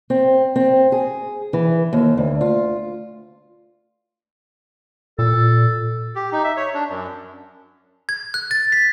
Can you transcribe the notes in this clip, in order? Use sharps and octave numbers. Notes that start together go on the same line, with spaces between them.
C4
C4
G#4
E3
D#2
D2
F4
A#2 A4
G4
D#4
E5
C#5
D4
F#2
G#6
F#6
A6
B6